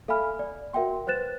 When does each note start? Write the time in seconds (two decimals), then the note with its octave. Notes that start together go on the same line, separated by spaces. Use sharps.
0.08 A4 E5 F5 G#5 B5 F6
0.39 D5
0.73 F#4 A#4 E5 F#5 G5 C6
1.07 B4 C5 F#6 A6 E7